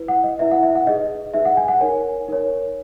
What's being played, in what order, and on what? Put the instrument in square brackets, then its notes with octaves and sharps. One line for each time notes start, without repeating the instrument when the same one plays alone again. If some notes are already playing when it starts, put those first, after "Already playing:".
Already playing: [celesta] E4 B4
F#5
D#5
E4 B4 E5
F#5
E5
F#5
D#4 G#4 B4 D#5
D#4 G#4 B4 E5
F#5
G#5
F#5
D#4 A#4 C#5 G#5
D#4 A#4 C#5